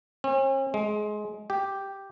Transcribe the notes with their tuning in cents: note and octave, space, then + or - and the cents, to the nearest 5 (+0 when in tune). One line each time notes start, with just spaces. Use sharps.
C#4 -45
G#3 +20
G4 +0